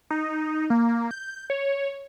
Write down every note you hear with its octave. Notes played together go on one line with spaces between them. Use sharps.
D#4
A#3
G6
C#5